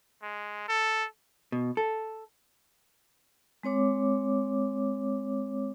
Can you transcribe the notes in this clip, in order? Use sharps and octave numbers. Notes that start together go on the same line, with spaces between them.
G#3
A4
B2
A4
G#3 C4 C#5 D6